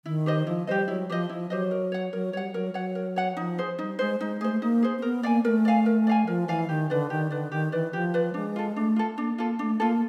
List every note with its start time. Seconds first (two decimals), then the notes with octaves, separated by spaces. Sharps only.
0.05 D#3 E4
0.26 G4 C5 D#5
0.46 F3 E4
0.67 G3 G4 C5 D#5
0.88 F#3 E4
1.09 F3 G4 C5 D#5
1.29 F3 E4
1.50 F#3 G4 C5 D#5
1.71 A#4
1.92 C#5 F#5
2.13 F#3 A#4
2.33 G3 C#5 F#5
2.54 F#3 A#4
2.74 F#3 C#5 F#5
2.95 A#4
3.16 C#5 F#5
3.37 F3 D#4
3.58 G#4 C5
3.79 G3 D#4
3.99 G#3 G#4 C5
4.20 G#3 D#4
4.41 A3 G#4 C5
4.53 A3
4.61 A#3 D#4
4.83 G#4 C5
4.98 C4
5.02 B3 A#4
5.23 A#3 D5 F5 G#5
5.44 A3 A#4
5.65 D5 F5 G#5
5.86 A#4
6.07 D5 F5 G#5
6.27 F3 A#4
6.48 E3 D5 F5 G#5
6.69 D#3 G4
6.90 D3 B4 D5
7.10 D#3 G4
7.31 D3 B4 D5
7.52 D#3 G4
7.72 E3 B4 D5
7.93 F3 G4
8.14 B4 D5
8.34 G#3 D4
8.56 F4 A4
8.76 A3 D4
8.96 F4 A4
9.18 A#3 D4
9.38 A#3 F4 A4
9.59 A3 D4
9.80 A#3 F4 A4